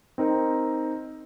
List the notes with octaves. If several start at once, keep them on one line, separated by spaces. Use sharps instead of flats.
C4 D#4 A#4